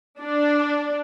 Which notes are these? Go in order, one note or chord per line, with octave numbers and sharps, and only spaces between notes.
D4